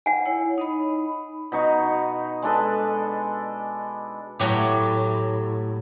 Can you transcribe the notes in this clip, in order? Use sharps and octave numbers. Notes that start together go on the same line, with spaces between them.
F#5 G#5
E4 C#5
D#4 D#5 B5
B2 D#4 C#6
G#3 D4 A4 B4
A2 F#3 G4